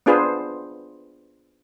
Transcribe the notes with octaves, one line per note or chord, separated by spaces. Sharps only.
B3 D4 F4 G#4 B4 C5